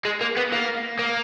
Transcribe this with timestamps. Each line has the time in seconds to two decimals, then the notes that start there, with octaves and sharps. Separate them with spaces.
0.05 G#3
0.21 A#3
0.37 B3
0.52 A#3
0.99 A#3